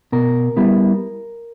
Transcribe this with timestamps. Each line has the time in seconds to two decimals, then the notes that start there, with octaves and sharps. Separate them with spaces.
0.12 B2 A#4
0.57 G3 B3 E4